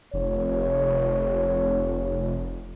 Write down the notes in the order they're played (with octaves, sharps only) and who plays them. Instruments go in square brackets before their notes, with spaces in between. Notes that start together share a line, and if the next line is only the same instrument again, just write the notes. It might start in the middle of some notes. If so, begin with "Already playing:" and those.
[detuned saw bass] F1 [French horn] C#5